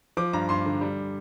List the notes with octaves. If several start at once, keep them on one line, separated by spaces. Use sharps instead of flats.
F3 D6
G2 A#5
G2 C6
D3
G3